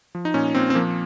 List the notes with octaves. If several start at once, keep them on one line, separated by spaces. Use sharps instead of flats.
F3
D#4
A#2 C#4
A#2 C4
C4
F3 A#3